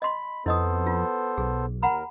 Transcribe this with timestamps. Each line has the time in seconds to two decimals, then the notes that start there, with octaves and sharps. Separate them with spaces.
0.02 D#5 B5 C6
0.46 F2 B3 E4 A4 C5 D#5 D#6
0.86 F4
1.38 B1 G#4
1.82 D#2 A#4 F#5 A#5 B5